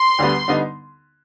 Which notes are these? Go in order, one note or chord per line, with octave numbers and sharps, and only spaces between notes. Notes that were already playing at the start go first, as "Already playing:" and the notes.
Already playing: C6
D2 D3 G3 B3
D3 G3 B3 D#4